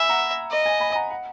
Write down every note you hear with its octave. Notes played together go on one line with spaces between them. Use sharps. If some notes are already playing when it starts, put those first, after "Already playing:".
Already playing: E5 G#5 B5
F#5 A#5
D#5
G#5
G#5 B5
G#5
F#5 A#5
F#5